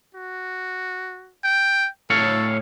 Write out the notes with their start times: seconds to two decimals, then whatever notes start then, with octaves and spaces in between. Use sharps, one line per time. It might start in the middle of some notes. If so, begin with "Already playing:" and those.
0.14 F#4
1.44 G5
2.10 A2 A4 C#5 F5